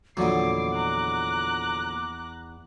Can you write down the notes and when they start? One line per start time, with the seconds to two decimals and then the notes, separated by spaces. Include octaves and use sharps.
0.17 A#1 E2 D3 F#3 D#5 D6 C7
0.74 A#5 F#6